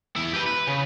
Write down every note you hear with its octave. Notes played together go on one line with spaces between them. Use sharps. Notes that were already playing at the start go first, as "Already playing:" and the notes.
E2 E4
G4 B4
B4
C#3